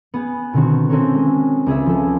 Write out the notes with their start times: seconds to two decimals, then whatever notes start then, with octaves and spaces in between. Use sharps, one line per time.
0.14 B3 G#4
0.53 B2 D3 D#3 C4 F#4
0.89 C4 C#4 F#4 A4 A#4 C#5
1.15 G#3
1.66 C#2 G#4 E5
1.86 F3 A4